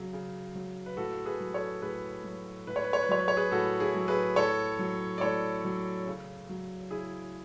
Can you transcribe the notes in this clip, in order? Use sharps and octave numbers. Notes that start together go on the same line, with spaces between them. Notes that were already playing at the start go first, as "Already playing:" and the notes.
Already playing: C#3 F#3
C#3
F#3
B4
A2 F#4 A4
G#4 B4
F#3
A4 C#5
A2 G#4 B4
F#3
A2 B4
C#5
B4
C#5
B4
F#3 C#5
B4
C#5
G#4 B4
A2 F#4 A4
E4 G#4
F#3
G#4 B4
A2 A4 C#5
F#3
D5
A2 A4 C#5
F#3
C#3
F#3
C#3 E4 G#4